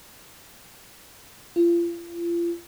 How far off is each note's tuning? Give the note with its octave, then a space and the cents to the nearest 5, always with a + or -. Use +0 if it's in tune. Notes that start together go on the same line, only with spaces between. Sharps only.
F4 -35